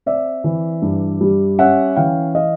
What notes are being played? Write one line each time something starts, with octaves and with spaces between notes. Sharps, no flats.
C4 D5 E5
E3
G2
G3
C#4 E5 F#5
E3 F5 G5
D#5 F5